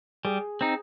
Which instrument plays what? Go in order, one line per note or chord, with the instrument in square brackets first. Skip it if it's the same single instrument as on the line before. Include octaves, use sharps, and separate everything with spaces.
[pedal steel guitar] G3 [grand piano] G#4
[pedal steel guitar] C4 D#4